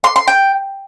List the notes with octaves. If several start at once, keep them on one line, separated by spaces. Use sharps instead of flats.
C6
C6
G5